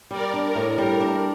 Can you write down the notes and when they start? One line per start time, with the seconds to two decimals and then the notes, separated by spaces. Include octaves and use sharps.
0.11 G3 A#4 D5
0.34 D4
0.45 A#4
0.55 A2
0.78 G3 A#4
1.01 D4